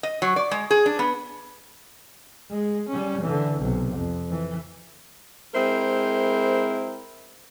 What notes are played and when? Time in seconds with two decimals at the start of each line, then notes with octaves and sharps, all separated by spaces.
0.03 D#5
0.22 F#3
0.36 D5
0.51 G#3
0.70 G#4
0.86 D4
0.99 B3
2.50 G#3
2.89 G3 C#4
3.22 D3 E3
3.59 B1 C3
3.96 F2
4.31 E3
5.54 G#3 C4 E4 A#4 C5